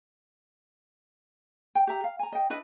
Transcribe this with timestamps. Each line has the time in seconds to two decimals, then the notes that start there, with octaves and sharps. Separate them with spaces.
1.75 G5
1.87 G4 E5 A#5
2.04 F5
2.19 G#5 A#5
2.32 D#5 G5
2.50 D4 E4 B4 D#5